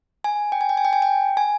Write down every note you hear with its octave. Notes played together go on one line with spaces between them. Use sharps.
G#5
G5
G#5
G5
G#5
G5
G#5
G5
G#5